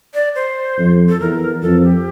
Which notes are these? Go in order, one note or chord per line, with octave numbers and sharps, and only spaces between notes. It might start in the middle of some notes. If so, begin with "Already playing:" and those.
D5
C5
F2
A4
E2 A#4
F2 A4
G4